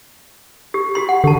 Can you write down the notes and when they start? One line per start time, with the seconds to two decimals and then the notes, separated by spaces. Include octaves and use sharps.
0.74 G4
0.95 F#4 G4 C6
1.09 F#5
1.24 D3 G4 A5